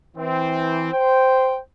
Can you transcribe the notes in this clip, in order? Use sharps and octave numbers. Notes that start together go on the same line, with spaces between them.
E3 C4
C5 G5